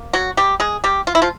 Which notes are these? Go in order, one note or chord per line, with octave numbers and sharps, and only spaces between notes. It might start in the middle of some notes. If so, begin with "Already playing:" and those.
Already playing: A#3
F#3 F#4
G3 G4
G#3 G#4
G3 G4
F4
E4
F3 F4